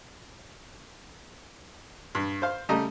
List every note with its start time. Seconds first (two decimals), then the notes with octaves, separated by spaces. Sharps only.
2.15 G2
2.42 C5 F5
2.69 C#3 G3 A3 D#5 A#5